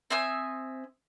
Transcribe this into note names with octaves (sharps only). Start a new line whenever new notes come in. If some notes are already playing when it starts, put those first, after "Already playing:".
C4 E5 G#5 D#6